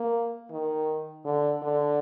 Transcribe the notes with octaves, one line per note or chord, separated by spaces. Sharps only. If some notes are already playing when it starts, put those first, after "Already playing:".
Already playing: A#3
D#3
D3
D3